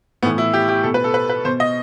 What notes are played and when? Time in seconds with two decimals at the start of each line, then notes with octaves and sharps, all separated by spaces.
0.22 A2 B3
0.26 E3
0.38 E4
0.54 G4
0.69 G4
0.83 B2 A4
0.94 B4
1.04 A4
1.14 B4
1.30 B4
1.45 B2 C5
1.60 D#5